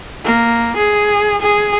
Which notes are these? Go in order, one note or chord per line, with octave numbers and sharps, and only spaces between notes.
A#3
G#4
G#4